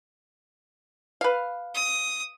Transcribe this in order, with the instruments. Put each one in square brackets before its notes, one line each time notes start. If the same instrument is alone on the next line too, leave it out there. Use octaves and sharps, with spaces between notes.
[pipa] B4 F5
[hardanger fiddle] D#6